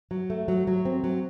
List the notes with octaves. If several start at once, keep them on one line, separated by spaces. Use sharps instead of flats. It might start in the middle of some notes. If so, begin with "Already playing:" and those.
F#3
A3
F#3
F#3
C4
F#3